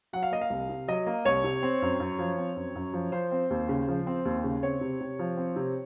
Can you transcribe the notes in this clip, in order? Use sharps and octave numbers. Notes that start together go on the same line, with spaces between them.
F#3 F#5
F5
A#3 D#5
F5
C2
C3
F#3 D#5
A#3
C2 C#5
C3
C4
F#2
F#2
F3
C4
F#2
F#2
F3
F3 C5
C4
D#2
C#3
F3
C4
D#2
C#3
C4 C#5
C3
C3
F3
C4
C3